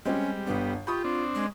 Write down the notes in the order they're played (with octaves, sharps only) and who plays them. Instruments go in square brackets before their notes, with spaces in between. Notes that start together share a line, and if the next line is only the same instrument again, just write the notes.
[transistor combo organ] G3 [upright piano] G#3 C4 G4 [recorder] C#4
[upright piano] G1 D4 [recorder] B3
[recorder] F4 [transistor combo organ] G4 [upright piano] B5 C#6 D#6
[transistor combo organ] C4 D4
[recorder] G#3